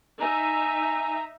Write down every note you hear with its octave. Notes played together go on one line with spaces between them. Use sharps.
D#4 E5 G#5 A#5